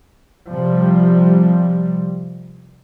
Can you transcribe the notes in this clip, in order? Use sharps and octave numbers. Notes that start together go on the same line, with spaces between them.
C3 F3 G3